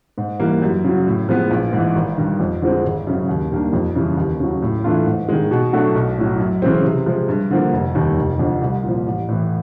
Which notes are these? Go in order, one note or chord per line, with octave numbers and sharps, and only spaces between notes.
G#2
E3 G3 A#3
F#2
C#3 F#3
A2
F3 G#3 B3
A#1
G#2 E3
G#1
G2 D#3
F2
D3 F3 G#3 C4
G#1
F#2 C#3
D#2
D#3 G3 A#3 D4
F2
C#3 E3 G3
D#2
C#3 F#3
A2
E3 A3 D4 F4
G#2
D#3 G#3
B2
F#3 A3 D4 F#4
B1
A2 F#3
F#2
C#3 E3 G#3 C4
C3
F3 G#3
G2
D3 F3 A#3
F1
D#2 D#3 G3
F1
F2 D3
C2
A#2 F3
A1
A2 E3